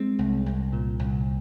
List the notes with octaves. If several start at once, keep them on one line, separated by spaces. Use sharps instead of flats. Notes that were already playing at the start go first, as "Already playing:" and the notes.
Already playing: G#3 C4
C2
C2
A#2
C2